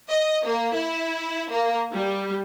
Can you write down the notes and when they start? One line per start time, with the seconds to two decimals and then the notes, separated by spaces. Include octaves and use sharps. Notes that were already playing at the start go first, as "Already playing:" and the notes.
0.10 D#5
0.44 A#3
0.75 E4
1.50 A#3
1.94 G3